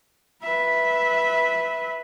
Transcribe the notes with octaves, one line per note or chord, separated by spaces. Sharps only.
B4 E5